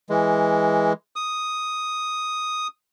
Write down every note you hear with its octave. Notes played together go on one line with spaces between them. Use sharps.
E3 G#3
D#6